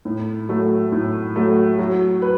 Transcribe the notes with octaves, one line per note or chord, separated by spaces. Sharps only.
A2
F#3 A3
A2
F#3 A3
F#3
B4